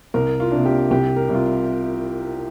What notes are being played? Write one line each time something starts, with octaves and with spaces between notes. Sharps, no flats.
C2 A#4
F4
C3 A#3 D4
G4
C2 G4
A#4
C3 G3 F4